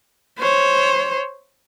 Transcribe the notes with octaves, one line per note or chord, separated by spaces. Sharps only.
C5 C#5